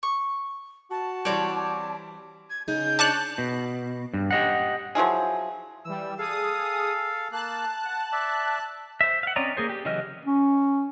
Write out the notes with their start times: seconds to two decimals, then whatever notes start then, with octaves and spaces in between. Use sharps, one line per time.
0.03 C#6
0.91 F#4 A5
1.25 E3 G3 C4 C#5 D5
2.50 G#6
2.68 C#3 D#4 G#4 G6
2.99 D4 C#5 D5 A5 F#6
3.38 B2
4.14 G2
4.31 G4 D#5 F#5
4.95 F3 F#3 E4 G#4
5.85 E3 G3 E6
6.18 G#4 A4 F5 D#6
7.32 A#3 A5 F#6
7.85 F#5
8.12 D5 E5
9.01 C5 E5
9.23 F5 F#5
9.36 C4 C#4 D5 D#5 A#5
9.57 A#3 G#4 C5
9.69 G4
9.85 C#3 E3 F#3 D#5 F6
10.25 C#4